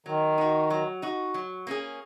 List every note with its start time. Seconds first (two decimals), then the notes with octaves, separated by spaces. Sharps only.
0.06 D#3 F#3
0.38 D#4 F#4
0.70 F#3
1.02 D#4 F#4
1.34 F#3
1.67 A#3 C#4 G#4